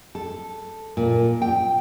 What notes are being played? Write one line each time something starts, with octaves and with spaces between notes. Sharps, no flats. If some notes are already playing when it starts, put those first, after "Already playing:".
A4
A#2
G5